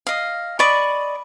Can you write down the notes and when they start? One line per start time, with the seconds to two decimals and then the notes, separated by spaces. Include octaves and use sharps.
0.07 D#5 F5
0.59 D5 D#5 B5 C#6